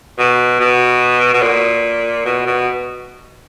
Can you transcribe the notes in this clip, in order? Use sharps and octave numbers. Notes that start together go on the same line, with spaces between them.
B2
B2
B2
A#2
B2
B2